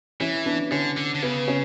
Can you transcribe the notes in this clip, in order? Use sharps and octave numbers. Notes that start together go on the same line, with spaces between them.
E3 C#4 E4
B3 D4
D3 C#4
D3
D3
C#3 B3
C#4